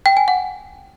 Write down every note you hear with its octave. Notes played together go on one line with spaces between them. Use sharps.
G5
G#5
F#5